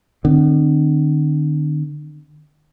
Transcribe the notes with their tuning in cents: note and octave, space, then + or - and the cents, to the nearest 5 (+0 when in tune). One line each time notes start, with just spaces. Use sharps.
D3 +45 C4 +0